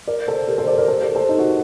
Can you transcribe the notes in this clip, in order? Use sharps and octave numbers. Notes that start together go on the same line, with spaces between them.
A#4 D5
A4 C5
G4 A#4
A4 C5
A#4 D5
A#4 D5
A4 C5
G4 A#4
A4 C5
D#4
F#4